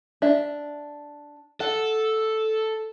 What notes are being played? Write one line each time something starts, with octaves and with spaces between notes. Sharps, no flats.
D4 E5
A4 F#5